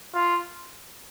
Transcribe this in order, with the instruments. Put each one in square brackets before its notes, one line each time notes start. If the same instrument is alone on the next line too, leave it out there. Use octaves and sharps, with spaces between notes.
[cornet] F4